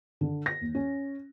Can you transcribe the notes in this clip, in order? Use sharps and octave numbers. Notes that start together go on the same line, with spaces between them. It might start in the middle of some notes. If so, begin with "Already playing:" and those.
D3
A#6
D#2
C#4